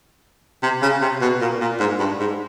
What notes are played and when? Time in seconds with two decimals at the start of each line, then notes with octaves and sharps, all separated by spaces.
0.63 C3
0.82 C#3
1.02 C3
1.21 B2
1.41 A#2
1.61 A#2
1.80 G#2
2.00 G2
2.20 G#2